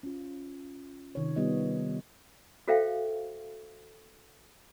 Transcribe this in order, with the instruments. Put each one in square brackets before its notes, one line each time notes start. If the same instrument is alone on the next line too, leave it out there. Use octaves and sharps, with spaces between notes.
[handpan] C#4 F4
C3 D#3 C#5
G3 B3 D#4 F4 D#5
[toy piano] F#4 A4 C5 E5 F5 G5